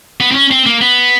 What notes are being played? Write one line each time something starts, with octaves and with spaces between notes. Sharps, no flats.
B3
C4
C#4
C4
A#3
B3